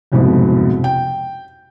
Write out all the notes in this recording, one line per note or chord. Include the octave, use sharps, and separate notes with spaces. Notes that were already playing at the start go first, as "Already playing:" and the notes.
F#1 C2 F2 G#2 B2
G5